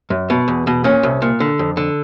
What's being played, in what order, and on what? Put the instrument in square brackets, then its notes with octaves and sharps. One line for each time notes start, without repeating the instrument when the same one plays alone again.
[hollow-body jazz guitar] F#2
B2
E2
B2
A#2 C#4
C2
A#2
D3
F2
D3